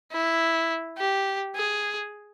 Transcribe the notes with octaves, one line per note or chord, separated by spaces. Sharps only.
E4
G4
G#4